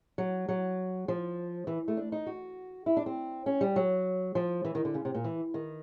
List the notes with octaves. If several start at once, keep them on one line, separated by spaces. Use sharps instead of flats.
F#3
F#3
F3
E3
A3
D4
D#4
F#4
E4
D4
C4
C#4
G3
F#3
F3
E3
D#3
D3
C#3
C3
A#2
E3
D#3